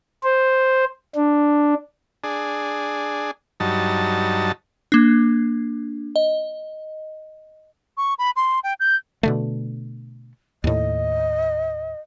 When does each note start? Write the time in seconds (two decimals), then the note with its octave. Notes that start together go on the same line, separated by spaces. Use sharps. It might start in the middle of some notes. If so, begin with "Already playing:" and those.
0.23 C5
1.15 D4
2.24 D4 G#4
3.60 G2 F#3 D#4 A5
4.92 A#3 D4
6.16 D#5
7.97 C#6
8.19 B5
8.36 C6
8.63 G5
8.80 G6
9.23 B2 D3 A3
10.64 D#2 A2 D#5